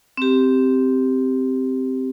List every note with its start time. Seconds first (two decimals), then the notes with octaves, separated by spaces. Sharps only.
0.17 C4 G4